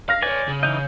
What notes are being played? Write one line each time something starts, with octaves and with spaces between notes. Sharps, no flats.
F5 F6 A#6
B4 C#5 D5 G#5
C#3
E3 D#4 D#5 G6